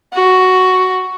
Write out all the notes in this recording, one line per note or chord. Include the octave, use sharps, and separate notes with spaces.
F#4